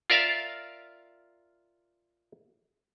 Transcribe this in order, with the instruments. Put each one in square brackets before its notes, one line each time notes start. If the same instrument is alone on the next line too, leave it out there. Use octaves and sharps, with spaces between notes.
[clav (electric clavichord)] F4 A#4 D5 E5 F5